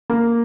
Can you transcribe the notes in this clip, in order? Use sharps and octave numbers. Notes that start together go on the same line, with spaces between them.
A#3